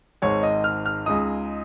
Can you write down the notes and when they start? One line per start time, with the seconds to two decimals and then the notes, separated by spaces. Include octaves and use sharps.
0.22 G#1 G#2 G#3 C#5
0.43 D#5
0.64 F6
0.86 F6
1.06 C#2 C#3 G#3 D#4 D#6